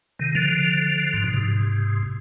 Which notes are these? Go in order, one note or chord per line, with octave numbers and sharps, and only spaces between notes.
C3 D#3
D3 F3
G#2
B2
G#2 C3